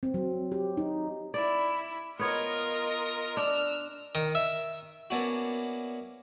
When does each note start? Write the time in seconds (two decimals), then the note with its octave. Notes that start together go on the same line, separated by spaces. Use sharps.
0.03 C4
0.14 F#3
0.52 G4
0.77 D#4
1.34 E4 D5
2.19 B3 F4 A#4 C#5 D#5
3.37 D4 E6 F6
4.15 D#3
4.35 E5
5.10 A#3 B3 C#4 D4 E4 F#4